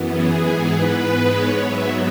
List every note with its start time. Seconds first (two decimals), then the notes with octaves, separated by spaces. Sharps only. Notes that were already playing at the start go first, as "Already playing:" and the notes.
Already playing: F#2 E3 B3
0.08 G#4
0.38 G#2 E3 B3
0.69 B4
1.00 G#2 G#3 B3
1.31 C#5
1.62 G#2 F#3 B3 E5